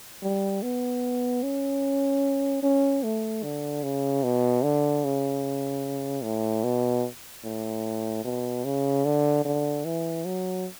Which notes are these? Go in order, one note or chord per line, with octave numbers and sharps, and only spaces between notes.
G3
B3
C#4
C#4
A3
D3
C#3
B2
D3
C#3
A2
B2
A2
B2
C#3
D3
D3
E3
F#3